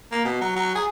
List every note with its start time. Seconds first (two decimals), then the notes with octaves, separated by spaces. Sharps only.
0.12 A#3
0.25 B2
0.41 F#3
0.56 F#3
0.75 G#4